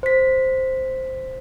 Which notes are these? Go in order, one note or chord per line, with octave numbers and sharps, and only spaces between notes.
C5 B6